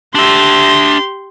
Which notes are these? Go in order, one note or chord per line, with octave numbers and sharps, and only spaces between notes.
D4 G4 E5 C6